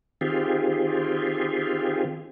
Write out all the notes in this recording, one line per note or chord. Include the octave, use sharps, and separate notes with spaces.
D#3 C4 F4 G4 G#4